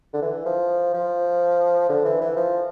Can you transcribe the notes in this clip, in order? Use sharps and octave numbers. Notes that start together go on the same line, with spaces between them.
D3
E3
F3
F3
D3
E3
E3
F3